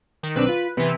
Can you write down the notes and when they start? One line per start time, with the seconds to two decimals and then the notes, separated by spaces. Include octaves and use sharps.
0.23 D#3
0.36 B1 C4 D4 B4
0.49 F4
0.77 C3 E3 B3